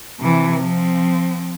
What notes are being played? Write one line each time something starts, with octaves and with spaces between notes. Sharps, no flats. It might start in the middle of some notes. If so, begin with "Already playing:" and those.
C3 E3
F3 C4